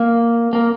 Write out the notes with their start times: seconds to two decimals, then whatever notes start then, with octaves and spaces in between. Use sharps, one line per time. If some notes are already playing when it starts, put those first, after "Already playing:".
Already playing: A#3
0.53 A#3